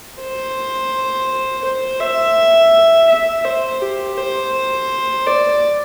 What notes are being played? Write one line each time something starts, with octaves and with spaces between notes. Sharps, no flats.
C5
C5
E5
E5
C5
G4
C5
D5